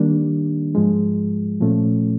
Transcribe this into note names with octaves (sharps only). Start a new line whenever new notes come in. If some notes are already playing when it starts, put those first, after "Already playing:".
Already playing: D#3 G3 A#3 D4
G#2 F3 G#3
A#2 F3 A3 C#4